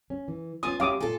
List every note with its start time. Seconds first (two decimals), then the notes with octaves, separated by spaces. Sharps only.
0.10 C#4
0.28 E3
0.63 B3 C#4 F4 G#5 D#6
0.80 F#2 C#4 G4 E5 F5 D6 D#6
1.00 A#2 F4 A4 G#5